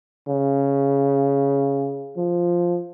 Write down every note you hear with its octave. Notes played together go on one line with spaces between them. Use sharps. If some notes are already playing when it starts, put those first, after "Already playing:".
C#3
F3